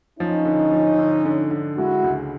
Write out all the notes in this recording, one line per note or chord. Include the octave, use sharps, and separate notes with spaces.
F3 C#4 D#4
D3
F3
D3
D3
D3
G#3 E4 F#4
C#2